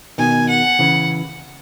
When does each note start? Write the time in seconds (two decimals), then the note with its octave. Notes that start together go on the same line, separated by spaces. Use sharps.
0.18 B2 D#3 G#5
0.49 F#5
0.79 C#3 E3